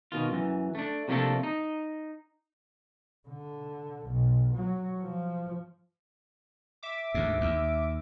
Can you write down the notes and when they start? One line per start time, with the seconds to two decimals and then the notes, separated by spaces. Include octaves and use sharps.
0.12 B2 D#3 F4
0.31 F#2 E3
0.75 A3 D4
1.08 C3 F3 A3 A#3 D4 A4
1.43 D#4
3.28 D3
4.06 B1
4.54 F#3
5.01 F3
6.83 E5 D6
7.14 D2 G#2
7.41 D#2